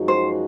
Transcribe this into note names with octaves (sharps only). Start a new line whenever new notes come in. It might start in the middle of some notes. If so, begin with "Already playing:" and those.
Already playing: F#2 F3 G#3 D#4 F#4
C5